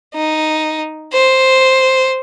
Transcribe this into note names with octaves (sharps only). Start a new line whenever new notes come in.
D#4
C5